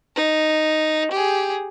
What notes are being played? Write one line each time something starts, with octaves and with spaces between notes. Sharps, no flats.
D#4
G4 G#4